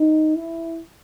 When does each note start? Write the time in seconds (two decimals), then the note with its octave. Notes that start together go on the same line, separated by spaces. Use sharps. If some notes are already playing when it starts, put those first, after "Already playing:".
Already playing: D#4
0.35 E4